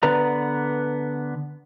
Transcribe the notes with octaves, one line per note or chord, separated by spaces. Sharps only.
D3 B3 B4 D5 A#5